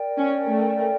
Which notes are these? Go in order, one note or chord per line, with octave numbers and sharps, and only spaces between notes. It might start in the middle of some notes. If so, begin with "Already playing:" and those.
Already playing: A#4 D5 G5
C#4
A3